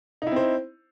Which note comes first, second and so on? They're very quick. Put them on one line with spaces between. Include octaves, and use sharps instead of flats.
D#4 E4 C4 C5